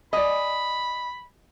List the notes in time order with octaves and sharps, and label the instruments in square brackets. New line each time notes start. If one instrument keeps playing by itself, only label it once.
[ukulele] D5 G#5 [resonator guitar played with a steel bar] D#5 [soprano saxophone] B5